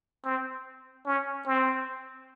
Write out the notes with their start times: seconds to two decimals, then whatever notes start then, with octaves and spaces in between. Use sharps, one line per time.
0.24 C4
1.06 C#4
1.46 C4